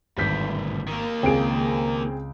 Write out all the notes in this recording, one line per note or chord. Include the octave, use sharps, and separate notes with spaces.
G#1 D2 G2 G6 B6
D#3 A#3
C#2 C4 G#4 D7